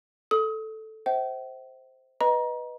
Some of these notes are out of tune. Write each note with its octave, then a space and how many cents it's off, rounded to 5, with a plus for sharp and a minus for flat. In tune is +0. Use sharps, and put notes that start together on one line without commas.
A4 +0 D#6 +30
C5 +0 E5 -30 G5 -45
B4 -5 D#5 +0 A#5 +30